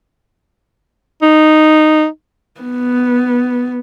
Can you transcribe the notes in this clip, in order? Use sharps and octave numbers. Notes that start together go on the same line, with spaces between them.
D#4
B3